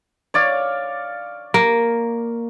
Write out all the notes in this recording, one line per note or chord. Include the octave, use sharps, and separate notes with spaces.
C#5 D5 F5
A#3